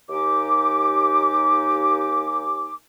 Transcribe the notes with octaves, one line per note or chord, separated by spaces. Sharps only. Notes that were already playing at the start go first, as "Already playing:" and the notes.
D#2 A#3 D#4 G4 G#5 D6